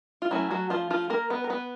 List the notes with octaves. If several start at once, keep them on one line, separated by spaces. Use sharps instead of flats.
F4
F#3 A3 C#4 E4
F#3 F#4
F3 F4
F3 F4
A#3 A#4
B3 B4
A#4
B3 B4